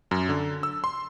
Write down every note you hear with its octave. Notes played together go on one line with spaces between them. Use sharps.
F#2
D3
E6
C6